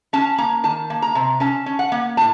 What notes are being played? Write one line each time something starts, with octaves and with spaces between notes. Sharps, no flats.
C#4 A5
A#3 A#5
D#3 A5
A#3
A#5
C3
C#4 A5
C#4
F#5
A#3
A2 A5